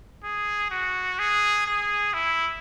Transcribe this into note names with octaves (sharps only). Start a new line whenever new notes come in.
G#4
F#4
G#4
G#4
E4